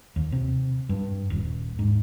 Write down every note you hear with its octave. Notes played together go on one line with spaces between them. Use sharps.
D#2
C3
G2
D#1
G#2